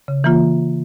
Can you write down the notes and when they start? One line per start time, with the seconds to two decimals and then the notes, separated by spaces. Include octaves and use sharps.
0.08 C#3
0.24 E3 A#3 F4